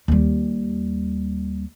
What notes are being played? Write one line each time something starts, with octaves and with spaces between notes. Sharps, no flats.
D#2 G3